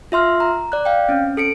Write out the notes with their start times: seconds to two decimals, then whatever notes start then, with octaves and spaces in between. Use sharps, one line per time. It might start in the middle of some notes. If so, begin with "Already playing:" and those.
0.12 F4 E5 C6 F6
0.40 A#5
0.72 D5 F#6
0.85 F5 G5
1.09 C4 C#4
1.37 A4 C#7 D7